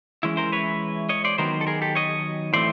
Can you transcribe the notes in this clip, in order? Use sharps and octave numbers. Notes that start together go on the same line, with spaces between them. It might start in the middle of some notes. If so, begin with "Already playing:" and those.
E3 G#3 C#4 E4
A#4 C5
B4 C#5
C#5 D#5
C5 D5
D#3 F#3 B3 A#4 C5
A4
G#4 A#4
G4 A4
C#5 D#5
A2 E3 A3 C4 C5 D5